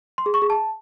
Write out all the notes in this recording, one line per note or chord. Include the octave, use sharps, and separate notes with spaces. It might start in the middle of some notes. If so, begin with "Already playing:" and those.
C6
G#4
C#6
G#4
A5